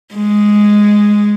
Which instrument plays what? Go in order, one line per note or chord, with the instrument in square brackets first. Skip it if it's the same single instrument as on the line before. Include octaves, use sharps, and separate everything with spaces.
[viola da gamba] G#3